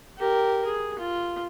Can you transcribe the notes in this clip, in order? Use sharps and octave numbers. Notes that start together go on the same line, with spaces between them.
G4 A#4
G#4
F4